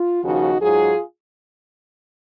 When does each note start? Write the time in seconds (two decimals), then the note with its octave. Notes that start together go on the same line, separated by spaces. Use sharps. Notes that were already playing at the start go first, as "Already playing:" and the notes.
Already playing: F4
0.23 D#2 C#3 F3 D#4 F#4
0.61 G#2 F#3 F4 G#4